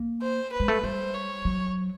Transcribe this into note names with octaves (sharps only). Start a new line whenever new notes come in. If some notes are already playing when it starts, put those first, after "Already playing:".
Already playing: A#3
C5
B4
G#3
A3
G3 C5
C#5
F#3